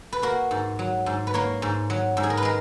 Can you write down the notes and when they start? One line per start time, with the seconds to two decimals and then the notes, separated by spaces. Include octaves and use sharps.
0.13 B4
0.22 A#3 F#4 A#4
0.51 G#2
0.79 F#3
1.06 G#2
1.27 B4
1.34 A#3 A#4 C#5
1.62 G#2
1.90 F#3
2.17 G#2
2.23 G#4
2.30 A#4
2.37 B4
2.42 G#3 A#4